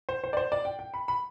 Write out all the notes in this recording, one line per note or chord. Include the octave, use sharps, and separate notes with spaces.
C5
C5
D5
C5
D5
G5
G5
B5
B5